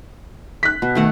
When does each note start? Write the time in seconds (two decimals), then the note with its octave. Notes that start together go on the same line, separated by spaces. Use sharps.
0.63 F#6 B6
0.82 B2
0.95 D#3 A3 F#5